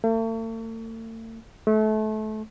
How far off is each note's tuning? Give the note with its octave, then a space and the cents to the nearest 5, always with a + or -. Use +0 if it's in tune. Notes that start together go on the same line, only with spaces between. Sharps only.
A3 +45
A3 -25